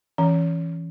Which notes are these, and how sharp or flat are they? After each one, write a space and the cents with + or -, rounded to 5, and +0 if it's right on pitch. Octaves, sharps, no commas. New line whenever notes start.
E3 +0 C#4 +0